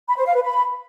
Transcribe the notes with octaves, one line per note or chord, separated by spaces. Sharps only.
B5
C5
F5
B4
B5